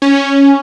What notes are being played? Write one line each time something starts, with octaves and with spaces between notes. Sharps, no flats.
C#4